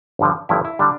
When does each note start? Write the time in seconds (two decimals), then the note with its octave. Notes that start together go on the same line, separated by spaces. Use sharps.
0.19 G1 G2 D3 F3
0.49 G1 G2 F3 E4
0.65 E4
0.79 D3 G3 D4